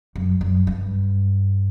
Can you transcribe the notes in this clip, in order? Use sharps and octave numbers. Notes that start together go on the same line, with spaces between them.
F#2
F#2
G2